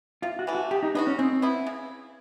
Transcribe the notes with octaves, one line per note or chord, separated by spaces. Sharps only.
C3 F4
F#4
E3 A3
F#4
G#3 G4
D#4
B3 D4 D#4 F#4
C#4
G#3 C4
B3 E4
C#3